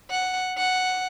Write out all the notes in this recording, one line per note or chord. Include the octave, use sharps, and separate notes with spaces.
F#5
F#5